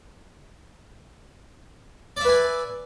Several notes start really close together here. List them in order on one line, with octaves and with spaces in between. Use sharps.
D5 E5 B4 G#5